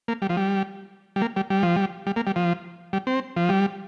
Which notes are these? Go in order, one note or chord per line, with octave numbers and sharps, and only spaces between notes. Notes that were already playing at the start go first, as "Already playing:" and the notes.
A#3
G3
F3
G3
G3
A#3
G3
G3
F3
G3
G3
A#3
G3
F3
G3
C4
F3
G3